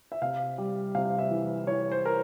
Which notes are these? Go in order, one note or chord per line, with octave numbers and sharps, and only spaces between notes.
E5
C3 F5
G3
C3 F5
E5
E3
E3 C#5
C5
A#4